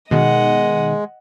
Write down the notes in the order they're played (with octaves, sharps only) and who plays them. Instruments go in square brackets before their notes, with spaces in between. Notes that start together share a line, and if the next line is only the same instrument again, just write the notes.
[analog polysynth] B2 D#3 [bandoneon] G#3 [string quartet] D#5 F#5